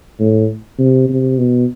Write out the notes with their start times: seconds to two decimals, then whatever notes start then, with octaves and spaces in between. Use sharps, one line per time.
0.19 A2
0.79 C3
1.09 C3
1.38 B2